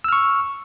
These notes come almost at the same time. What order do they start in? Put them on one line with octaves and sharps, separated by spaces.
E6 F6 C#6